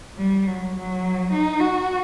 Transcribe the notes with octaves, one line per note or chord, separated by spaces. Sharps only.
G3
F#3
F#3
D#4
F#4